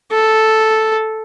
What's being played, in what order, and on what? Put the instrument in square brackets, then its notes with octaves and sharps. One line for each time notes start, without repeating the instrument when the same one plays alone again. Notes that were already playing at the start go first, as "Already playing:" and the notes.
[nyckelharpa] A4